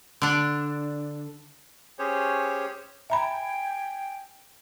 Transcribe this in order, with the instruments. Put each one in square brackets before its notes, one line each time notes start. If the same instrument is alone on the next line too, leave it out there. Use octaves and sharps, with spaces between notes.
[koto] D3 D4
[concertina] C#4 G4 G#4 C5 C#5
[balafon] E5 A#5 B5 [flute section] G5 G#5